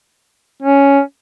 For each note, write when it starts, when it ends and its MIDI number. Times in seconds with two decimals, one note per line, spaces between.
0.62 1.00 61